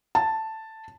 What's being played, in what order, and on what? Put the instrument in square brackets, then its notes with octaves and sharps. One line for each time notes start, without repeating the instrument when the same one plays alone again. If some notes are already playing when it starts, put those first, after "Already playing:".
[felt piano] A5